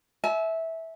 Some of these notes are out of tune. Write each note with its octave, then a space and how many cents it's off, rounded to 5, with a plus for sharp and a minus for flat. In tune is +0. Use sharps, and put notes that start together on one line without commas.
E5 -15 G#5 +45